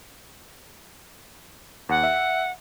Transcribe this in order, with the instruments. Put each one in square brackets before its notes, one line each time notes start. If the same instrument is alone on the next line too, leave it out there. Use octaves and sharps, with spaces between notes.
[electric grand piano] D#2 [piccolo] F#5
[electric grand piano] E5